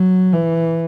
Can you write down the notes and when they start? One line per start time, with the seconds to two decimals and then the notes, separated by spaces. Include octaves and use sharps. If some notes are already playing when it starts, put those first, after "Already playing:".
Already playing: F#3
0.33 E3